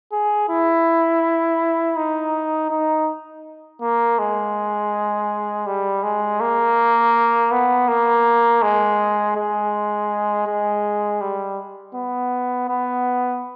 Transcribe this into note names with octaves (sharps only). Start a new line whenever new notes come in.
G#4
E4
D#4
D#4
A#3
G#3
G3
G#3
A#3
B3
A#3
G#3
G#3
G#3
G3
B3
B3